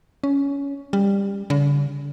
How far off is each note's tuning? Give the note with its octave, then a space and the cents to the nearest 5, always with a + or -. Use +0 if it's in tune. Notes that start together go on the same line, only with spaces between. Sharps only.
C#4 +15
G3 +20
D3 -45